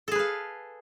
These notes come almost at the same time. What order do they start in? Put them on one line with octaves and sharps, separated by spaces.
A4 G#4 B4 F5